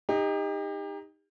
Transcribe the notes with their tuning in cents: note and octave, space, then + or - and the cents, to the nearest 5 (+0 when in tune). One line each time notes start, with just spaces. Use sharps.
D#4 +0 G4 +35